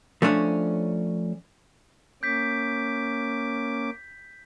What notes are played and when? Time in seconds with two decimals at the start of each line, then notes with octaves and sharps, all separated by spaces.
0.22 F3 A3 C#4 D4 C#5
2.23 A#3 C#4 D6 G6 B6